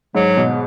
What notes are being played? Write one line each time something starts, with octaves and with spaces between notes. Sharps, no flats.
G#2 F#3
B2